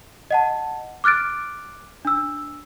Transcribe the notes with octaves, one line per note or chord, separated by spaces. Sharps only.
D#5 F#5 A5
D6 F6 F#6 A6 D7
D4 E6